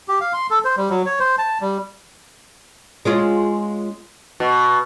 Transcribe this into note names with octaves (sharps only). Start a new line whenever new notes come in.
G4
F5
C6
A4
C5
G3
F#3
C#5
C5
A5
G3
G#3 C#4 F4
B2